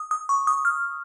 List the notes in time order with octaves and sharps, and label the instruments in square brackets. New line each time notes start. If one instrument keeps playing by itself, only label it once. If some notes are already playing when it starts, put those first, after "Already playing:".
Already playing: [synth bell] D#6
D#6
C#6
D#6
F6